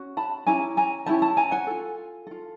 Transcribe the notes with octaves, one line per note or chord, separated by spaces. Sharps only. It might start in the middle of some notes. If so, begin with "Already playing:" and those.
Already playing: C#4 F#4
A5 B5
C#4 E4 G4 G#5 A#5
G#5 A#5
C#4 E4 G4 A5 B5
A5 B5
G#5 A#5
F#5 G#5
F4 A4
F4 A4